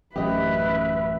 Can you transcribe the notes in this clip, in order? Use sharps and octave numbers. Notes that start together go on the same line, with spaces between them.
A1 F#2 G4 B4 D#5 E5